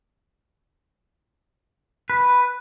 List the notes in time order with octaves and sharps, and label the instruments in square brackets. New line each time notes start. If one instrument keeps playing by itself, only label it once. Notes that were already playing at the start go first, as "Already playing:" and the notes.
[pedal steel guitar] B4